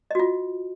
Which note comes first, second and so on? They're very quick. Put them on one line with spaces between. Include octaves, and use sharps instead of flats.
D#5 F#4 F4